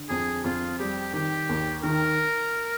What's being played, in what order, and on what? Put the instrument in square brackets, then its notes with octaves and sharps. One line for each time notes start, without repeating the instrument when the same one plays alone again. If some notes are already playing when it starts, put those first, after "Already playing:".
Already playing: [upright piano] D3
[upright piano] F2 [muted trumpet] G#4
[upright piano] F2 [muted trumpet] F4
[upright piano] G3 [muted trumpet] G4
[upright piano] D#3 [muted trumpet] G4
[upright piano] D#2
[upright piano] D#3 [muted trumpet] A#4